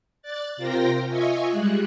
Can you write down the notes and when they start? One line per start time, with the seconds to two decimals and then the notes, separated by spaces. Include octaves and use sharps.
0.22 D5 F#6 A6
0.57 C3 F4 A#4 C5 G5 A#6
1.06 F4 D#5 E5 G#5 C#6
1.49 G3 G#3 F#6